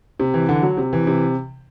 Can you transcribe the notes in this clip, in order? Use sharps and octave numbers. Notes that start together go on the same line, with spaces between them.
C3
E3
D3
F#3
C3
E3
C3